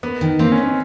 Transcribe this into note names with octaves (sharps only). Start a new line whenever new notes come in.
A#3 B3
D#3
A#3 C4
C#4
D#3
C#4